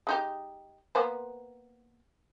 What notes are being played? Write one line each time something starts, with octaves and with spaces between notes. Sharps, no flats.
G#3 D#4 G4
A#3 B3 C5